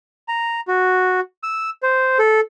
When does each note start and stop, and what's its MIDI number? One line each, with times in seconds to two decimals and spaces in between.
0.28 0.60 82
0.68 1.20 66
1.43 1.70 88
1.83 2.18 72
2.19 2.40 69